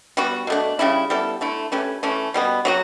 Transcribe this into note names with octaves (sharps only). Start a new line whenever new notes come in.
G3 B3 F#4
B2 A3 D4
C#3 G3 C#4 E4
G3 B3 E4 A4
D3 A3 E4
A3 C#4 G4 B4
E3 A3 C#4
B2 G3 B3
F#3 B3 F#4